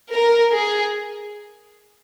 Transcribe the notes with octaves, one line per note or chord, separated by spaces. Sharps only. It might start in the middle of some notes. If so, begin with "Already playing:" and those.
A#4
G#4